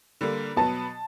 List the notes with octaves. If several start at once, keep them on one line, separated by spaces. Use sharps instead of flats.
D3 G3 A#3
B2 F#3 B3 A5